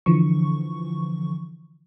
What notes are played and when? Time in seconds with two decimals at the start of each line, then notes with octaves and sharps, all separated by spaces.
0.06 D3 E3 F3 C#6